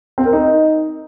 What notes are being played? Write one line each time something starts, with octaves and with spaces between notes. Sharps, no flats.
C4
A#4
D#4